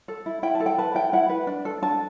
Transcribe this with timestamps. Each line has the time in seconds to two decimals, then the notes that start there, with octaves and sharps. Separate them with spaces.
0.08 A4
0.26 E4
0.43 E4 G5
0.55 A5
0.60 A4
0.66 G5
0.78 B4 A5
0.95 E4 G5
1.13 E4 F#5
1.29 B4
1.47 D4
1.65 A4
1.82 D4 A5